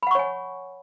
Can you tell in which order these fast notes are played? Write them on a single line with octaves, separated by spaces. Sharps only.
B5 F#5 C#6 C#5 G#5